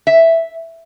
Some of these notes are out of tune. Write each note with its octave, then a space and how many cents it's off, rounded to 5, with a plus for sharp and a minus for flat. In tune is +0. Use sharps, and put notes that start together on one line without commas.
E5 +0